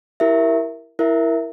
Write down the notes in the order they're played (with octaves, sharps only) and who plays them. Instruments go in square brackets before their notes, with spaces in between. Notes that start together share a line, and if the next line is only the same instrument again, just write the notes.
[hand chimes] E4 G4 A#4 E5
E4 A#4 E5